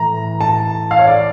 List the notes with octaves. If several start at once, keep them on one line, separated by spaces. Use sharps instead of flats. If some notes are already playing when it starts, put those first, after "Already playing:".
Already playing: A2 E3 A#5
A5
F5
C#5
D5